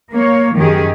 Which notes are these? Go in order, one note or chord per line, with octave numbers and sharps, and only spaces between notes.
A#3 C#5
F#2 D#3 G4 G#4